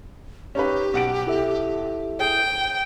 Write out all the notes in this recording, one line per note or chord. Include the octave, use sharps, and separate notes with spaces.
C#4 D#4 G4 B4
B1 F#5 D7
E4 A4 E5
G#4 G5